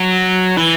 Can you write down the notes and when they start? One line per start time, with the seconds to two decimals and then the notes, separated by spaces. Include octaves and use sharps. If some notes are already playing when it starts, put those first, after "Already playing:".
Already playing: F#3
0.57 E3